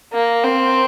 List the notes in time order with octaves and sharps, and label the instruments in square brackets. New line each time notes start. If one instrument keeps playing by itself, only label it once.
[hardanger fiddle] A#3
C4